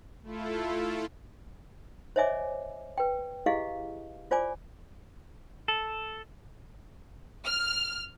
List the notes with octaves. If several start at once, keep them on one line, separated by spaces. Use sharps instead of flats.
A3 E4 F4 A4
C5 C#5 D#5 E5 G#5 D6
B4 G5
E4 G4 G#4 D#5 F5
F4 C5 D5 G#5 D6
A4
F6